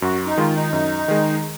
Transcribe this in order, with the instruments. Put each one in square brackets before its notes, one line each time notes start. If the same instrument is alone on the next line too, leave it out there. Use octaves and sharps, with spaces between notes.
[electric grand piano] F#2 [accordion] F#4
[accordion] D#4
[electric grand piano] D#3 G#3 [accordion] F4
[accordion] D#4
[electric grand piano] F#2
D#3 G#3